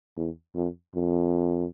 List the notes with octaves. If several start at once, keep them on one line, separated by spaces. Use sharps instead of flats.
E2
F2
F2